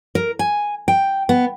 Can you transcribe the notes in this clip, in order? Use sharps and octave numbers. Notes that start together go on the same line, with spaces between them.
A#4
G#5
G5
B3